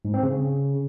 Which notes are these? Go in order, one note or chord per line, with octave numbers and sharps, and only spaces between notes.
G#2
C4
C#3